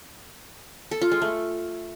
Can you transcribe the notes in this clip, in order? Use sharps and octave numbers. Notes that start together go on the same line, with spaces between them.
A4
F4
G#3
A3